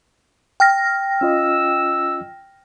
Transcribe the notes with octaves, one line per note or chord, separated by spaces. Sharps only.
G5 F6 A#6
C#4 F4 D#5 E6